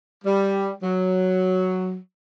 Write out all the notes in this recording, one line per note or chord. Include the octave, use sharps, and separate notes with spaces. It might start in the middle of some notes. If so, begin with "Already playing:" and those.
G3
F#3